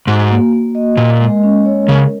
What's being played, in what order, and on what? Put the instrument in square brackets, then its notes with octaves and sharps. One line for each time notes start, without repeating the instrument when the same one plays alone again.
[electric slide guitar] G#2 [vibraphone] F#4
[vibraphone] A#3
A#3
D#5
[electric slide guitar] A#2 [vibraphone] A#4
[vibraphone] G#3
C#4
C#5
[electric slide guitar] C#3 [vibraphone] A#4